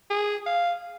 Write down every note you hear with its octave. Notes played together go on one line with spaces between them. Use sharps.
G#4
F5